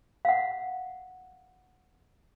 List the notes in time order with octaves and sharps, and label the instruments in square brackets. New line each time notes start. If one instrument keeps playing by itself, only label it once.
[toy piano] F5 F#5